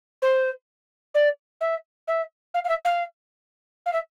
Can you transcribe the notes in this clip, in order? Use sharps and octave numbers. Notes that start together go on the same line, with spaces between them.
C5
D5
E5
E5
F5
F5
E5
F5
F5
E5